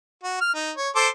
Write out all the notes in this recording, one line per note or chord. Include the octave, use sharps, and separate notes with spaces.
F#4
F6
D#4
C#5
A4 C5 D6